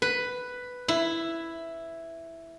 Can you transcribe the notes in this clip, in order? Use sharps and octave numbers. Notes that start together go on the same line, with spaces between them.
B4
E4